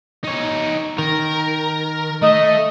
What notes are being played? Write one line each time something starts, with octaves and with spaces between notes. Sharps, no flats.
D#4 C#5
D#3 A#4
A3 D#5